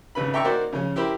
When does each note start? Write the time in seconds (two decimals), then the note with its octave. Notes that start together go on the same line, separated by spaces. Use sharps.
0.15 G#1 C#3 B4 B5
0.33 D5 E5 G5 A#5 C#6
0.44 A#3 D#4 F#4 A#4 C5 D5
0.72 C#3 F3 C#4
0.96 E4 G4 A#4 C5 B5